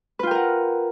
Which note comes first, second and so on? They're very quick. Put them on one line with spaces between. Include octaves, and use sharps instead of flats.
B4 F4 G5 A#4 F#5